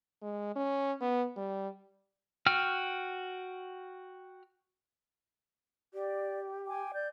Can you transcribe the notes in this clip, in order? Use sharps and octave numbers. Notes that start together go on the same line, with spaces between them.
G#3
C#4
B3
G3
F#4 G5 F6
G4 D5
G5 G#5 D6
D5 G6